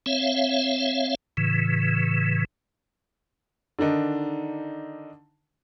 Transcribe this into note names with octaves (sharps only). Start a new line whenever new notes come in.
C4 C#5 E5 F5
A2 C#3 E3
D3 D#3 D4 D#4